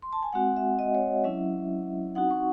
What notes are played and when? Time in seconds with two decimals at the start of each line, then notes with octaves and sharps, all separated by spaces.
0.02 C6
0.13 A5
0.23 G#5
0.32 G#3 C4 F#4 F#5
0.57 E5
0.79 D#5
0.95 C#5
1.24 F#3 C#4 E4 E5
2.15 C4 D#4 F#4 F#5
2.31 C#6